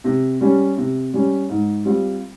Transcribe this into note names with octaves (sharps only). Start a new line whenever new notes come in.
C3
G3 C#4
C3
G3 C#4
G#2
G3 C4 F4